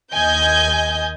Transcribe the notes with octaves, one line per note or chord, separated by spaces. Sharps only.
D#2 D#5 G#5 G6